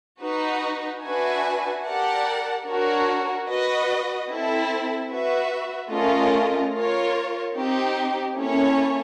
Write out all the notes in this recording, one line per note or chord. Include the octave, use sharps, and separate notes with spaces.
D#4 F#4 B4
D4 F#4 B4 E5 G#5
G4 A#4 D5 F#5 A5
D4 F#4 A#4 C#5
F#4 B4 D#5
C4 E4 A4
F#4 B4 E5
A3 C#4 F4 A#4 D#5
F4 A#4 C#5
C4 D#4 G4
A#3 C#4 E4 A4 C#5